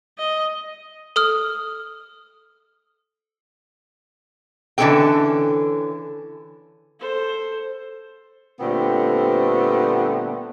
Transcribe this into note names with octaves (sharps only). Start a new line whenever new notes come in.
D#5
A4 D#6 F6
D3 E3 A3 C#4 A4 G5
A4 C5
A#2 D3 G3 A3 B3 C4